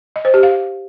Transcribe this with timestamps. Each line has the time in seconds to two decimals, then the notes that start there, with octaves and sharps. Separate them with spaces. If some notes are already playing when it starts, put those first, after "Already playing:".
0.16 D#5
0.25 C5
0.34 G4
0.43 F5